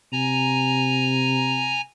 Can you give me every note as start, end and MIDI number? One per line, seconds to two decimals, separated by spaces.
0.12 1.82 48
0.12 1.81 80
0.12 1.81 82